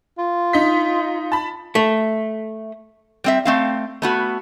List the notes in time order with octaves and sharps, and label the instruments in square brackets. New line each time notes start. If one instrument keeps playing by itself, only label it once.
[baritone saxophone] F4
[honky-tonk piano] D#4 D#5 B6
A5 B5
[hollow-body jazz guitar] A3
[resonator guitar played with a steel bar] G3 C4 E5
A3 C4 F5
A3 B3 F#4